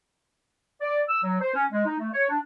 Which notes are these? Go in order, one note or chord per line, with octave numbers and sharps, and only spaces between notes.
D5
E6
F#3
C5
C#4
G#3
D#4
A3
C#5
D4